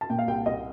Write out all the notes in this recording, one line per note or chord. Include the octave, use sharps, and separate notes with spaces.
A5
A#2 G5
F5
C2 G5
C2 D#5